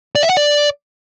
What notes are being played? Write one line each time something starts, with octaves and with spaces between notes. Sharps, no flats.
D5
E5
F#5
D5